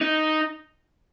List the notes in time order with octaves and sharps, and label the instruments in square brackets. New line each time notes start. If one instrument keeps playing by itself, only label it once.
[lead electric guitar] D#4